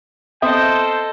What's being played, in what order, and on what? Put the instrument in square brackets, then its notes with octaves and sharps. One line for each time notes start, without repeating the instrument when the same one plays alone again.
[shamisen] B3 C4 E5 [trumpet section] F4 C5 G5 [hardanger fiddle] A4 D#5